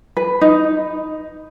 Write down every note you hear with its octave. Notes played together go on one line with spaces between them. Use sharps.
B4
D#4